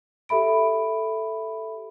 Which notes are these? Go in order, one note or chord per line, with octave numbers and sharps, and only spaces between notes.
G4 A4 E5 B5 D7